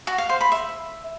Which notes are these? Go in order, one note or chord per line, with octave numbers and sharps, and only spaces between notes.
F#4
F5
C5
B5
E5